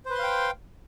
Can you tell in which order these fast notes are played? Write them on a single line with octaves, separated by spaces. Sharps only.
C5 B4 C6 F5 G5